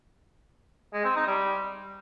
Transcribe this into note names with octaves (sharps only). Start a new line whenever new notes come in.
G#3
C4
D#4
G3